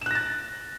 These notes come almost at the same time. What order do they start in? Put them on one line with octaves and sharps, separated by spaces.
E7 F#6 A#6 A6